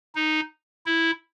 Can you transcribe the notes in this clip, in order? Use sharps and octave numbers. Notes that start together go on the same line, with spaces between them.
D#4
E4